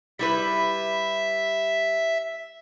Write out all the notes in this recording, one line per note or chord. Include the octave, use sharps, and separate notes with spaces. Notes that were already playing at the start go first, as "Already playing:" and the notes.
G3 E4 B4 E5